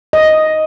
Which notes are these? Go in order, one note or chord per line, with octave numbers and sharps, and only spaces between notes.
D#5